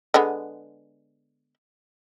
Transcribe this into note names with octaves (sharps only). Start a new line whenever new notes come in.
D3 G#3 B3